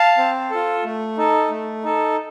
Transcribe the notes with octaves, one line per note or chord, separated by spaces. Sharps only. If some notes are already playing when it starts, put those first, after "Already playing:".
Already playing: F5 A5
C4
F4 A4
A3
D#4 A4
A3
D#4 A4